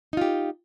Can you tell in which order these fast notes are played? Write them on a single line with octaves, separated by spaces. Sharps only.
D#4 F4 G4